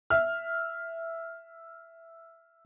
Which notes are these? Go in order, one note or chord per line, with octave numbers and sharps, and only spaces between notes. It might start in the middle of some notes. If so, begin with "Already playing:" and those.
E5 F6